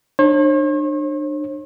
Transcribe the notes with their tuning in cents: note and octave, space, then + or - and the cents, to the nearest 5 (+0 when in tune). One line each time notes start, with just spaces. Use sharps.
D4 +35 C#5 -45